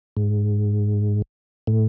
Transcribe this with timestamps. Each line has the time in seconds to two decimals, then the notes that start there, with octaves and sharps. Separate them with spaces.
0.17 G#2
1.67 A2